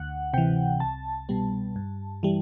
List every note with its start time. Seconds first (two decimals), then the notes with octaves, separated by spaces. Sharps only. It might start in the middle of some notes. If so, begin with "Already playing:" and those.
Already playing: D2 F#5
0.33 C3 E3 G5
0.80 C2 A5
1.29 B2 G3 B3
1.76 G2
2.23 E3 G3